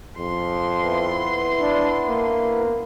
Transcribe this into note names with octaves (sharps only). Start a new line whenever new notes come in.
F2 C6
B3 E4 B4
D4
A#3